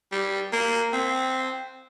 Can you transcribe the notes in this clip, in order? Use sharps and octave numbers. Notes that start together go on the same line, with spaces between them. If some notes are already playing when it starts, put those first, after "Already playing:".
G3
A#3
C4